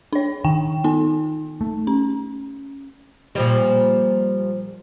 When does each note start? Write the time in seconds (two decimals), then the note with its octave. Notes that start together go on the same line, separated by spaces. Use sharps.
0.13 D4 C#5
0.45 D#3 G5
0.84 B3 D#4
1.61 A3
1.87 C#4
3.35 A#2 F3 G3